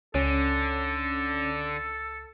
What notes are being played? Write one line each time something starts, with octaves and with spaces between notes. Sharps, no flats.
C#2 D3 C#4 A4